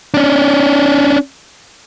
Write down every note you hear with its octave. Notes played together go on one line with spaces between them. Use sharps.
C#4 D4